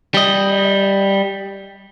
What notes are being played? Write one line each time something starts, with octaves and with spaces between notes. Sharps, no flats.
G3 D#5